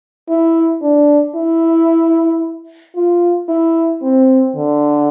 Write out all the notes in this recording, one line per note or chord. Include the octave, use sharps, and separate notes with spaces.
E4
D4
E4
F4
E4
C4
D3